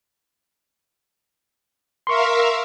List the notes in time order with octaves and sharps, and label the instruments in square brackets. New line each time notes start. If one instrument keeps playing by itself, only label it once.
[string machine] A#4 E5 F5 [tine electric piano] C6 C#6